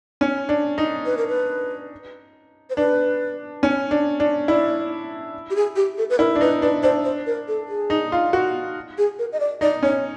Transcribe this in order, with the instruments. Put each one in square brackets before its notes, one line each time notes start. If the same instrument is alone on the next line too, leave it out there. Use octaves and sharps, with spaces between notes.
[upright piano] C#4
D4
D#4
[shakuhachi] B4
A#4
B4
C5
[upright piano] D4 [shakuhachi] B4
[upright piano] C#4
D4
D4
[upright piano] E4 [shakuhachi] D5
[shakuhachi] G4
G#4
G4
A4
B4
[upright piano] E4 [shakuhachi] A#4
[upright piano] D4
[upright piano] D#4 [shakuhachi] B4
[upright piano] D4 [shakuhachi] B4
[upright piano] D4 [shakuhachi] C5
[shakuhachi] C5
A#4
A4
G#4
[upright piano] D#4
F4
F#4
[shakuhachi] G#4
A#4
D#5
D5
[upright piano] D#4 [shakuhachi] D5
[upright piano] C#4 [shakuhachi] C#5